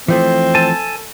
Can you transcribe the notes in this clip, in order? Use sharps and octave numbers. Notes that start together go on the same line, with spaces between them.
E3 F3 A3 C4
A4 G#5 A5